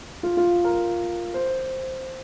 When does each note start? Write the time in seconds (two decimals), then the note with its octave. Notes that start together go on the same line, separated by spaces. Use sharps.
0.23 F4
0.37 F4
0.64 A#4
1.34 C5